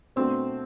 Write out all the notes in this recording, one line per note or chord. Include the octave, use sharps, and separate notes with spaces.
B2 A3 C4 D4 F#4 C5